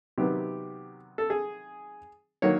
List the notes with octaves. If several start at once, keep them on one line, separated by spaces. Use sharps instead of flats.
C3 D#3 F#3 B3 G4
A4
G#4
D#3 F#3 A#3 C#5